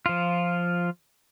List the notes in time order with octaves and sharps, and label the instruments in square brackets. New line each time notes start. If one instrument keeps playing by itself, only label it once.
[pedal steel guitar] F3 F4